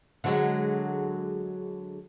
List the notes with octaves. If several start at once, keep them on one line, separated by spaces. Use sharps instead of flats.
D3 F#3 G#3